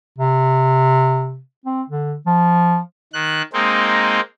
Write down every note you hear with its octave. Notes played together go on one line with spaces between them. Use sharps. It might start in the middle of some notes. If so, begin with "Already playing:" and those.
C3
C4
D3
F3
D#3 F#6
G#3 A#3 C4 D#4